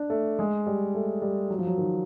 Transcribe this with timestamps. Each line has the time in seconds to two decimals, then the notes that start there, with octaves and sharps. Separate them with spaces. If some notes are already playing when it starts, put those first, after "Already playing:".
Already playing: D4
0.10 A3
0.39 G#3
0.67 G3
0.95 A3
1.22 G3
1.50 F#3
1.59 F3
1.67 F#3
1.78 D#3